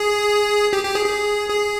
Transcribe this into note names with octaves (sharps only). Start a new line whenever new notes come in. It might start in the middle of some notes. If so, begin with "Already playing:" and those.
Already playing: G#4
G4
G4
G#4
G#4
G#4